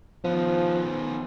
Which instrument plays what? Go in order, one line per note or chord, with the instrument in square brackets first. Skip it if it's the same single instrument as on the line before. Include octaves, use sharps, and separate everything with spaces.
[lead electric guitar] D#3 B3 [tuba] F3